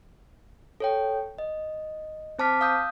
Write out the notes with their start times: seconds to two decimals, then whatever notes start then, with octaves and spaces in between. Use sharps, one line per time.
0.80 A4 C#5 G5
1.38 D#5
2.38 C4 C5 A5 D6 F6 B6
2.61 F5 D#6 E6 G6